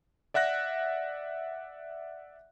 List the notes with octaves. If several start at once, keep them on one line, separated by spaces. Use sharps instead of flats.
D5 E5 F#5 F#6 A#6